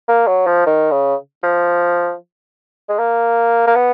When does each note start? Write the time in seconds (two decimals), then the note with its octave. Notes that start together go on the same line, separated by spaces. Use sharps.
0.08 A#3
0.27 F#3
0.47 F3
0.66 D#3
0.91 C#3
1.43 F3
2.89 G#3
2.99 A#3
3.67 A#3
3.76 B3